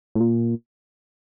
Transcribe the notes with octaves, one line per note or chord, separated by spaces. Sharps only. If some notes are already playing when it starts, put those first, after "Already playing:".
A2
A#2